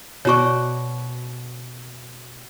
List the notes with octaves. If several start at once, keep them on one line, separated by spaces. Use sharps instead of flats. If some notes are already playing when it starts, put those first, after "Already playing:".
B2 F#4 C#5 D5 C#6